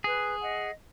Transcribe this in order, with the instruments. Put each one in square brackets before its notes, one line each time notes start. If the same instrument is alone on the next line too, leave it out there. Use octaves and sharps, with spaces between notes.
[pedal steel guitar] G#4 [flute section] B4
[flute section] D#5 F#5